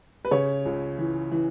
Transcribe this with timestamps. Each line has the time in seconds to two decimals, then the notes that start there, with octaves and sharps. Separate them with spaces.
0.25 B4
0.31 C#3 C#5
0.65 C#2
0.98 E3
1.32 E3